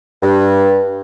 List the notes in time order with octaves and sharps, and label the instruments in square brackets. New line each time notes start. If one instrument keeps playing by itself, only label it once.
[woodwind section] G2